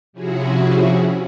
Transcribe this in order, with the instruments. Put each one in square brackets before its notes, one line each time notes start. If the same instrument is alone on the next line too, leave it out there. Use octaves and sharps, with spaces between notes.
[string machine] C3 F3 C#4 E4 F#4 G#4